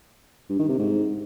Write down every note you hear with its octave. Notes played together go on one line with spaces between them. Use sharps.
G2
D#3
C3
G#2